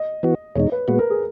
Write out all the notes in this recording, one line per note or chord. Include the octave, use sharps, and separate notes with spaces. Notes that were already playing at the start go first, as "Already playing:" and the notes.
Already playing: D#5
E3 B3 F#4
E2 B2 G#3 D#4 C#5
B4
A#2 G#3 B3 F#4 B4
A#4
G#4